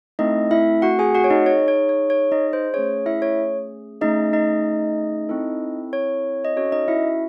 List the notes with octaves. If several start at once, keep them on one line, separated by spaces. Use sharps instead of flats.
A3 C4 D#4 E4 A4 D#5
E4 E5
F#4 F#5
G#4 G#5
F#4 F#5
C#5
D#4 D#5
D#4 G#4 C#5
C#5
C#5
C#5
D#4 D#5
C5
A3 C#4 G#4 C#5
E4 E5
C#5
A3 C#4 D#4 G#4 D#5
D#4 D#5
C4 E4 A4
C#5
D#5
C#4 F#4 A4 C#5
D#4 D#5
E4 E5